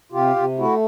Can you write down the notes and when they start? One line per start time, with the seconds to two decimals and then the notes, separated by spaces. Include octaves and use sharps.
0.12 C3 F4 G4
0.36 C3
0.58 A3 E4 F#4